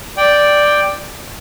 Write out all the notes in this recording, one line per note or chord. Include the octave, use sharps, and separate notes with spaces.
D5 G5